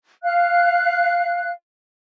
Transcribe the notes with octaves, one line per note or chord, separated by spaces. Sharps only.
F5 F#6